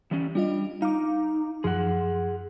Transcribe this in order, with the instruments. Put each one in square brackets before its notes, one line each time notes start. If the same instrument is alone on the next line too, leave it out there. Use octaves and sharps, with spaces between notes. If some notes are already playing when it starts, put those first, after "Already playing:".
[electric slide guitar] E3 G3 C#4
[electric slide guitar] G3 [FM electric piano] D4 F4 D#5
[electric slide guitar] D#4 [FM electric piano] F5 D6
[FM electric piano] F#2 F3 C6 [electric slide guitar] G#4 F#5